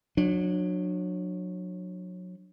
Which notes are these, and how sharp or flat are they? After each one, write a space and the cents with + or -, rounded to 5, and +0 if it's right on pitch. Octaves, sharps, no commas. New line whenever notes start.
F#3 -25 D4 +20